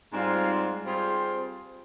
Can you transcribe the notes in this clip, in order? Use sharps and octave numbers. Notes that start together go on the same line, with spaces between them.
G#2 G3 C4 F4
G3 C4 F4 G#4 C5